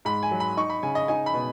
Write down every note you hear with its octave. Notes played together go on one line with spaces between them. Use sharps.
G#2 B5
G#5
F#3
B5
D#4 C#6
B5
C#3 G#5
D#5
D#4 G#5
B5
B2